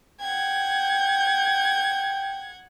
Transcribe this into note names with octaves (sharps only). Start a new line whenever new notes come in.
F#5 G5 G#6